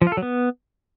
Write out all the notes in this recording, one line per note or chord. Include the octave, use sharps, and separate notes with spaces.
F3
F4
A4
F#3
B3